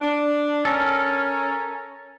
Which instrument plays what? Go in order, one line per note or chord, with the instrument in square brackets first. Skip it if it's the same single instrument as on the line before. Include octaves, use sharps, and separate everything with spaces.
[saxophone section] D4
[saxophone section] C#4 [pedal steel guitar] A4 A#4